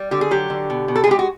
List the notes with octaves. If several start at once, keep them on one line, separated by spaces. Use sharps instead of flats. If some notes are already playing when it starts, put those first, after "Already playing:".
Already playing: G3
D3 G4
G#4
F#3 G4
D3
B2
B2
A4
G#4
G#3 G4
F#4